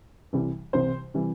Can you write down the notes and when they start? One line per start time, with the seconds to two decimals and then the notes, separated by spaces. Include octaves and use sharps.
0.33 C2 C3 E3 G3
0.73 C2 C3 E3 G3 C5
1.14 C3 E3 G3